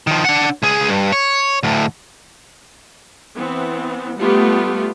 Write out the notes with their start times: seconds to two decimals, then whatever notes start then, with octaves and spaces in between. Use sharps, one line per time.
0.07 D#3 F3
0.25 D4 F#5
0.63 C#2 G#4
0.89 G2
1.12 C#5
1.63 D2 A2
3.35 E3 B3 C4
4.17 G3 A3 B3 F4 G4